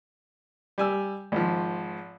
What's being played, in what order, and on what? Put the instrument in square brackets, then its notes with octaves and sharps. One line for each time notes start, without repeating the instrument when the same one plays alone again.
[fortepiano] G3 G#5 E6
G#1 F3